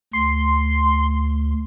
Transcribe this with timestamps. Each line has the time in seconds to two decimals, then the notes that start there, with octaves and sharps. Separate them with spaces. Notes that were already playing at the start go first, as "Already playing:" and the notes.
0.13 D2 C6